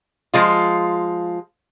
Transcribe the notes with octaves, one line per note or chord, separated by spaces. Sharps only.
F3 G#3 F4